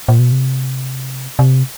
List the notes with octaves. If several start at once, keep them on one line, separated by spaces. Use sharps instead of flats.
A#2
B2
C3
C3